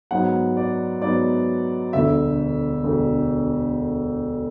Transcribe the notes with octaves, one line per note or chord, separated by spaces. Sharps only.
G#2 F#3 B3 F#5
D5
G#2 F#3 B3 D5
E1 D2 D3 E5
E1 D2 D3